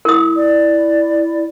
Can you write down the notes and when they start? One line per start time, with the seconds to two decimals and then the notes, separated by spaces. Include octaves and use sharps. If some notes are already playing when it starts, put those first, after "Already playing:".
0.05 E4 A#4 D#6
0.36 D5